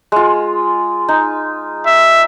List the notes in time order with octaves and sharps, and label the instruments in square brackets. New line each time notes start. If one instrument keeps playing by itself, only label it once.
[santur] G#3 F4
D#4
[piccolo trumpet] E5